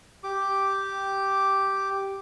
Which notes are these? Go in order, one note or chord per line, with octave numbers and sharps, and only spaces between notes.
G4 D6